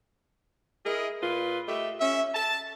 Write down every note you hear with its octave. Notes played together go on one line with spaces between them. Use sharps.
E4 G#4 A#4 D#5
A#2 F4 B4
A3 G4 D#5 E5
C#4 E5
A5